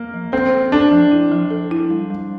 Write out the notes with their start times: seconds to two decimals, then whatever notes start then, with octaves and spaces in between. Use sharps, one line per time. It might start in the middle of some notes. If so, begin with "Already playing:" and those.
Already playing: A#3
0.14 F3
0.32 C4 A4
0.53 A4
0.72 D4 A4
0.92 F3
1.12 E4
1.32 F3
1.50 A4
1.71 E4
1.90 G3
2.10 G3